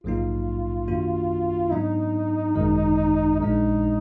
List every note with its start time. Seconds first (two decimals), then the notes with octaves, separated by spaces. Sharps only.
0.04 A#1 G#2 F#3 A#3 D#4 F4
0.88 F#2 D#3 A#3 D4 F#4
1.71 G#2 F#3 B3 D4 D#4
2.56 G#1 F#2 D#3 G#3
3.40 A#1 A#2 G#3 D4 D#4